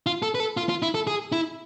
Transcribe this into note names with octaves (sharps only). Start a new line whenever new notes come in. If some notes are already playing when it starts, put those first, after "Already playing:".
F4
A4
B4
A4
F4
F4
E4
A4
G#4
E4